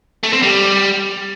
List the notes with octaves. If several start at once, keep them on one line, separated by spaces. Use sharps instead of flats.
A3
C4
G3